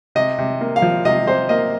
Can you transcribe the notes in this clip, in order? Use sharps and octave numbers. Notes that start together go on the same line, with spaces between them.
C3 D#5
C3
A#3
F5
F3
C3 D#5
C3 C5
A#3 D#5